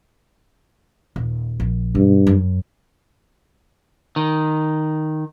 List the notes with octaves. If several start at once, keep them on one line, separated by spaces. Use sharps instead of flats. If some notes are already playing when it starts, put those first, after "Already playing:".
D#1
A#1
G2 B2
F#2
D#3